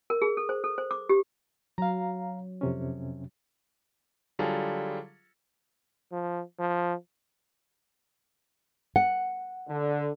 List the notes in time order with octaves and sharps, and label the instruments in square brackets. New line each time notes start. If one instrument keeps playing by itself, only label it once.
[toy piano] A#4
G#4
A4
C5
A4
C5
D6
G4
[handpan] F#3 [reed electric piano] F5 A#5
[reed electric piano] F2 C3 C#4
[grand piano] D3 F#3 G3 F4 G#4 A4
[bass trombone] F3
F3
[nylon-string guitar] F#5
[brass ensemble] D3